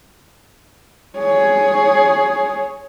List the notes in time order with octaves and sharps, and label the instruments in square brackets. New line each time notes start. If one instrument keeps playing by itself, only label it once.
[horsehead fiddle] G#4 C#5